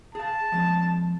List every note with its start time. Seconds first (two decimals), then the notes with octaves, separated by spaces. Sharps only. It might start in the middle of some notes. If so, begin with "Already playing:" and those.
0.15 G#4 F5 A5
0.52 F3 G#3 C4